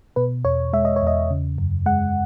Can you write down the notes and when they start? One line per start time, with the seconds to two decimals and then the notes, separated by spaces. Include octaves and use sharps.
0.16 B2 B4
0.45 E2 C#5
0.73 G#3 E5
0.85 D#5
0.96 C#5
1.02 E2 D#5
1.30 C#3
1.58 F#2
1.86 G#3 F#5